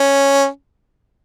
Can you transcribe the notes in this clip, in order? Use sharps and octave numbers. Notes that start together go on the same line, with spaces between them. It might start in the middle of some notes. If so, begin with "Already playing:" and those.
Already playing: C#4